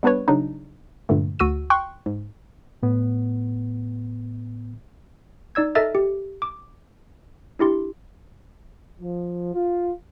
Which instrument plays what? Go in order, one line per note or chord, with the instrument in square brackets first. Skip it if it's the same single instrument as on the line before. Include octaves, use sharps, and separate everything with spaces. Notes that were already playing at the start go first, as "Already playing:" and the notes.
[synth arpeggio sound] G3 B3 D4 B4 C#5
C#3 F#3 D4 D#4
G2 A#2 D3 A3
D2 F#4 E6 D#7
G5 C6 C#6 F#6
G#2
[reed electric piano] A2 B3
[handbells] D#4 D5 E6 G#6
A4 A#4 D#5 E5 F6 A6
G4
D6
D4 E4 G4 C6
[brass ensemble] F3
F4